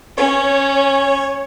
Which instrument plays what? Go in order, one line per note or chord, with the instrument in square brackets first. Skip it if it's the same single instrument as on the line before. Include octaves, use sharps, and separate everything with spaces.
[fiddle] C#4 [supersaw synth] C#5